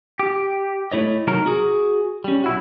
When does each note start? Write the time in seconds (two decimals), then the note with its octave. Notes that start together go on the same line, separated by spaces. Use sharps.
0.19 G4
0.92 A3 E4 C#5 D#5
1.27 C3 F#3 D#4 A#4 C#5 A#5
1.46 F#4 G#4
2.24 G3 C#4
2.44 B1 E4 F#4